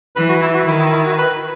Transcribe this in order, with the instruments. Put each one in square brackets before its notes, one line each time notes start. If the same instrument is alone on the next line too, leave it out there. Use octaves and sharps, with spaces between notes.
[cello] E3 [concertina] B4
[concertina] F#4
E4
F#4
[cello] D#3 [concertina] E4
[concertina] E4
E4
F#4
B4